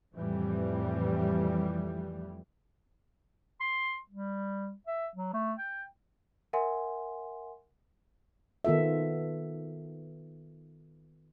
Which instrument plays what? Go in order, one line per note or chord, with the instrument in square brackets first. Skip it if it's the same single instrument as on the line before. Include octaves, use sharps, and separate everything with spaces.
[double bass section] F2 A2 E3 G3
[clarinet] C6
G3
E5
F#3
A3
G5
[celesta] A#4 E5 F#5 G#5 C6
[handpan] D#3 B3 F4 A4 E5